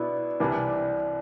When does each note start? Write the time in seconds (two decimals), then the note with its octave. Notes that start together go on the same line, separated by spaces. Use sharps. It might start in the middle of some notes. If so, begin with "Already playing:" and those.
Already playing: B2 B3 D4 E4
0.40 C2 C3 E3 G3 D4